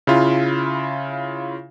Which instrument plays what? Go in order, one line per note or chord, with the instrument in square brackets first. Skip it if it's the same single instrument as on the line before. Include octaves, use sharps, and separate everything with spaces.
[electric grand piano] C#3 E4 F4